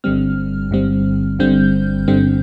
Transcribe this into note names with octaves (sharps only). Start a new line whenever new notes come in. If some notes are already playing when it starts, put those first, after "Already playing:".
G1 G2 D3 G3 C4 F6
G1 G2 D3 G3 C4
G1 G2 D3 G3 C4 G6
G1 G2 D3 G3 C4